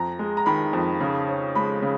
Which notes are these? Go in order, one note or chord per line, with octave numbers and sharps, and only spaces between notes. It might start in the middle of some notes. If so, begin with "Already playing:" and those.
Already playing: F2 A#5
G#3
A#5
D#3 B5
F2
C#3
C#4
G#3 B5
C#3